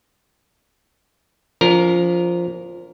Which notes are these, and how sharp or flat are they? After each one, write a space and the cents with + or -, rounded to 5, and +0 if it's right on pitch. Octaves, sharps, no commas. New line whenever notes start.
F3 +0 D4 -45 A#4 +0